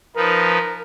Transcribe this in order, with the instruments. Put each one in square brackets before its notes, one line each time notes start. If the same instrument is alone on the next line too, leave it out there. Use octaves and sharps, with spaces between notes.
[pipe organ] F3 D#4 B4 [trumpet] A#4